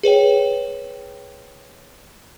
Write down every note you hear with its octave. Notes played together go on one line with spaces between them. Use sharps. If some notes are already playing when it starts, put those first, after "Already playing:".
G#4 B4 C#5 G5